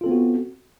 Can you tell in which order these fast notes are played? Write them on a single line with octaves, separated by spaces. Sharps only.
F4 A4 C4 B3 F#4